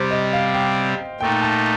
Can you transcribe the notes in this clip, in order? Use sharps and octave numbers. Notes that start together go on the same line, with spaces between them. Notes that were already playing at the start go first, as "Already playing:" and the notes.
Already playing: C3 G3 C4 C5
D#5
F5
G5
A#2 A3 D#4 G5
A5